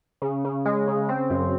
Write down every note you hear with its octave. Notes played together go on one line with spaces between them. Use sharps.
C#3
C#3
G#3
C#3
C4
F#2